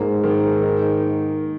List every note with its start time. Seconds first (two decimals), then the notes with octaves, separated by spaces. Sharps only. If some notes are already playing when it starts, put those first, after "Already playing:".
Already playing: G#2 A#3
0.23 D#3
0.63 D#4
1.03 A#3